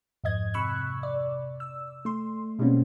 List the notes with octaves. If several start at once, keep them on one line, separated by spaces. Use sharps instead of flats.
F2 G#2 D#5 G#6
C3 B5 C#6 E6 F#6
D5
E6
A3 C6
B2 G3 G#3 A#3 C4 C#4